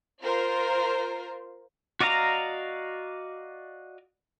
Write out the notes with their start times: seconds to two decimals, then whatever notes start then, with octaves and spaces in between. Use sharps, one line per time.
0.23 F4 A#4 C5
2.00 F#4 D5 D#5 F5 A#5